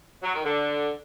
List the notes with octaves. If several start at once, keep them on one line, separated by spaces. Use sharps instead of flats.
F#3
D#3
D3